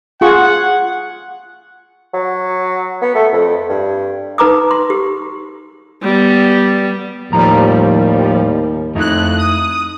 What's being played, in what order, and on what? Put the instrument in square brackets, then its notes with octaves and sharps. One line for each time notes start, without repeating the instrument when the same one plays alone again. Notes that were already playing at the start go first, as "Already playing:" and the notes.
[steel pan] F4 G#4 C#6 [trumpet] F#5
[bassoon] F#3
B3
A3
F2
G2
[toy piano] D#4 B4 A#5 D6 D#6
C6
G4
[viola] G3 B3
[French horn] D#2 [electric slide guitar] A2 A#5 [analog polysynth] F3 G3
[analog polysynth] F2 F#6 [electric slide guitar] A3 D#4 E4
[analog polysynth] D#6